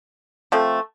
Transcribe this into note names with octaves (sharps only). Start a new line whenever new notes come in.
F3 A3 C4